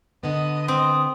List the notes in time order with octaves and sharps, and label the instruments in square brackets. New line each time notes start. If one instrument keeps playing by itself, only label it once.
[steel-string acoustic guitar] D3 B3 [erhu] D#5
[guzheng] C4 [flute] D#6